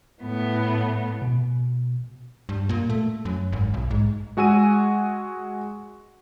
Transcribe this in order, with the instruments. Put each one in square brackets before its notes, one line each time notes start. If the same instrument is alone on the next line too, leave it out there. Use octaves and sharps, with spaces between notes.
[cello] A2 B3
[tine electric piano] B2
[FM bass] G2
A#2
A3
F#2
G#1
B1
G#2
[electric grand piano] G#3 F#4 G#5 E6 D#7